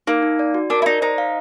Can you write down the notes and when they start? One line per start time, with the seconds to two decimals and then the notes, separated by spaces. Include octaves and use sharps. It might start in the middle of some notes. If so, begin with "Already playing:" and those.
0.07 A#3 D#4
0.22 D#4
0.39 D5
0.54 F#4
0.70 D4 A#4
0.82 E4
0.86 D#4 D5
1.02 D#4 C5
1.18 F5